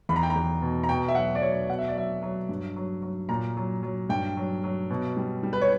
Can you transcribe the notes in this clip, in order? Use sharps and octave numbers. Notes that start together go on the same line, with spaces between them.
E2 B5
A#5
G5
A#5
E2
B2
A#5
B2 G5
E5
F#3 F#5
D5
F#3 C#5
B2 F#5
E5
D5
F#3 E5
F#3
G2
F#3
F#3
A#2 A#5
F#3
F#3
G2 G5
F#3
F#3
B2
G3
G3
B4
C#5